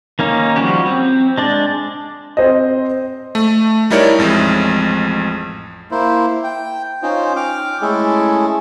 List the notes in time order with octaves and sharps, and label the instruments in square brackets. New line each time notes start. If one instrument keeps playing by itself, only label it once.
[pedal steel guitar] D#3 A#3 C#4 D#4
F3 G3 F#4 G4
C4
G#3 D4 D5
[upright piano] C4 C5 D#5
[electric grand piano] A3
G3 D#4 E4 A#4 C#5 D5
A1 F2 G#3
[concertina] A#3 E4 C5
G5
C#4 D#4 F4 C5
G5 D6 F6
G#3 A3 C#4 E4 G#4 A4